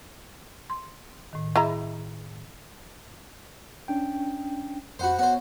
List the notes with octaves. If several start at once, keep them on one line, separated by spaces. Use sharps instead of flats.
C6
A2 D#3
E4 G#4 D#5 E5 A#5
C#4 D4 G5
F2 F#4 C5 F#5 B5
B3 F#4 C5 C#5